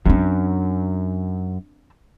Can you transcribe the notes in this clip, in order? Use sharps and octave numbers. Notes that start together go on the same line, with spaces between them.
F#2 C4 D4